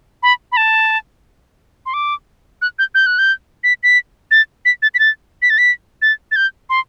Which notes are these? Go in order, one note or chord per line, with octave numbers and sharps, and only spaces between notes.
B5
B5
A5
C6
D6
F#6
G6
G6
F#6
G6
B6
B6
A6
B6
A6
B6
A6
B6
A6
B6
A6
A6
G6
C6